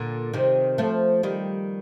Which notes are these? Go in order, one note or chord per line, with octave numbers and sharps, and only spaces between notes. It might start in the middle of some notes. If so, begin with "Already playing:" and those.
Already playing: A#2 D3
C3 D#3
F3 A3
D#3 G3